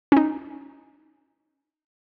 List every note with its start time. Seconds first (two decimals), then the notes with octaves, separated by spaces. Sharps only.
0.12 C#4
0.17 D#4